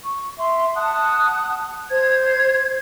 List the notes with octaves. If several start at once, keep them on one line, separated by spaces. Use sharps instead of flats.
C#6
E5 C6
F#5 A5 D#6 F#6
C5 G#6